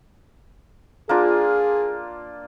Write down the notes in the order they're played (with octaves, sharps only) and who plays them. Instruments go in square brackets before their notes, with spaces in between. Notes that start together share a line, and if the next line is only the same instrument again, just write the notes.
[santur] A#3 D4 F4 [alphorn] G#4